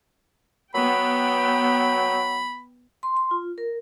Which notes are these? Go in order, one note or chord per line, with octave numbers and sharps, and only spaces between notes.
F#3 B3 G5 B5
C6
C6
F4
A#4